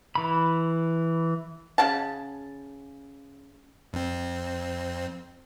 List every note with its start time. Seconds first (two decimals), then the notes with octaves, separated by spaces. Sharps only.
0.15 E3 B5
1.78 C#3 F#5 A5
3.93 F2 C4